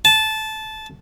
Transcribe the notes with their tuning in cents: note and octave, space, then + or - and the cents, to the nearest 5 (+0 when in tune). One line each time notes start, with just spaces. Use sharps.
A5 -15